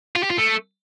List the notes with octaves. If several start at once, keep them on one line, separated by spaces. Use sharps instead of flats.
F4
G4
F4
A3